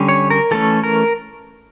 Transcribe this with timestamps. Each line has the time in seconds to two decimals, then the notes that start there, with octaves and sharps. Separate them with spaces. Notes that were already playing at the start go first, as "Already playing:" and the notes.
Already playing: D3 G3 C#4
0.09 C#5
0.30 A#4
0.51 E3 A3 C#4 A4
0.84 A#4